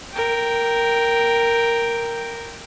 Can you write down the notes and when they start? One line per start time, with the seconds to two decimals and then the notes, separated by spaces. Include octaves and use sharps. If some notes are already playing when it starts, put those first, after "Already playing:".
0.14 A#4 G5